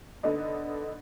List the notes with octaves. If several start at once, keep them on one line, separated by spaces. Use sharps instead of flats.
D3 B3 D4 D#4